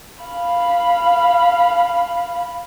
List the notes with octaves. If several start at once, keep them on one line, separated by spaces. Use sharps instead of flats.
F5 B5